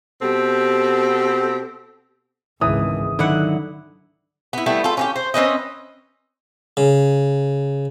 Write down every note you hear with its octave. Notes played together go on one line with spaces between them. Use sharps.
B2 C4 G4 A4
G#1 C#2 E3 D#6
D3 D#3 F#3 D#4 E4 F#5
B3 E4
G3 A3 B3 E4
F4 A4
C#4 D#4 G4
C5
C4 C#4 B4 D#5
C#3